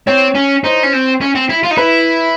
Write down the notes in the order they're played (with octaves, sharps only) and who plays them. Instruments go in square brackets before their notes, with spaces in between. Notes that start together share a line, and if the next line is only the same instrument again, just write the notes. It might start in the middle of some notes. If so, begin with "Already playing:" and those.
[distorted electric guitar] C4 [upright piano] C#5
[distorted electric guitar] C#4
[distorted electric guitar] D#4 [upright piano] C5
[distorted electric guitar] C#4
C4
C#4
C4
E4
F4
D#4
[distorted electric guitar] E4 [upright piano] B4